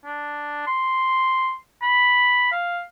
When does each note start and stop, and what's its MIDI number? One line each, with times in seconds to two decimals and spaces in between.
0.05 0.67 62
0.67 1.54 84
1.82 2.50 83
2.52 2.81 77